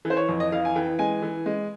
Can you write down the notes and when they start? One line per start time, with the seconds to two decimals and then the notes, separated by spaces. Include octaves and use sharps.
0.05 E3
0.10 C5
0.17 C#5
0.29 F2
0.40 D#5
0.52 E3 F5
0.65 G#5
0.76 E3 G5
0.99 G#3 G#5
1.22 E3
1.46 G#3